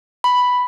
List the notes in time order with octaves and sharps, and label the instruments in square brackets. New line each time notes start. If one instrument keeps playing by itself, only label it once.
[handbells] B5